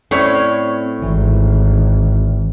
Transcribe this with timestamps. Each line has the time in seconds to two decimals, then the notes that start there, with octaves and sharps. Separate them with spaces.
0.11 A2 C4 C#4 C#5 D5
1.02 G#1 E3